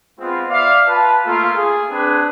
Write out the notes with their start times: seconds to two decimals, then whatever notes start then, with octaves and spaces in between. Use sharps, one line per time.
0.19 G#3 B3 C4 F4
0.49 D5 E5 F5
0.87 F4 B4 A5
1.25 A3 A#3 F4
1.55 G#4
1.89 C4 D4 G#4 B4